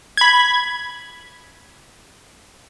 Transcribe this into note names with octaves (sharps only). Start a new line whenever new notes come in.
B5 G#6